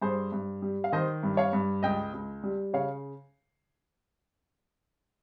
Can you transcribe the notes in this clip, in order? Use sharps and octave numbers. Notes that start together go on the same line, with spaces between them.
G2 G#4 C5
G2
G3
F5
D#3 C5 D#5
G2
C#5 F5
G2
C#2 D#5 G5
C#2
G3
C#3 C#5 F5